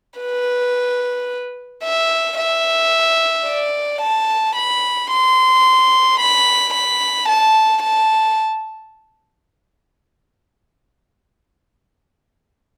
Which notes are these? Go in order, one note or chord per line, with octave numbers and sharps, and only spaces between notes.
B4
E5
E5
D5
A5
B5
C6
B5
B5
A5
A5